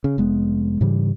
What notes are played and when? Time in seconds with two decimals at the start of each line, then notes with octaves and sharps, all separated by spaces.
0.04 C#3
0.18 F1 G#3 B3
0.81 G#2 C#3 E3 G3